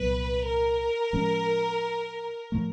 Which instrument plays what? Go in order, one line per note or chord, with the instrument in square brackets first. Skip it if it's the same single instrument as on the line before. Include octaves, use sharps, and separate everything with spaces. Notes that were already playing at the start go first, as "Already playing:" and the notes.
Already playing: [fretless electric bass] C2 A#2 F#3 B3 [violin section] B4
[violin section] A#4
[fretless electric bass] A2 F3 G#3 C#4
A2 F3 A3